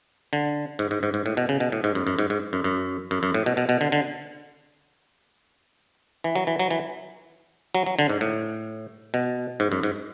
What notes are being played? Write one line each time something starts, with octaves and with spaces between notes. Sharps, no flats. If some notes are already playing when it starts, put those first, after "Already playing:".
D3
G#2
G#2
G#2
G#2
A2
B2
C#3
B2
A2
G#2
F#2
F#2
G#2
G#2
F#2
F#2
F#2
F#2
A2
B2
B2
B2
D3
D3
E3
F#3
E3
F#3
E3
F#3
F#3
D3
G#2
A2
B2
G#2
F#2
G#2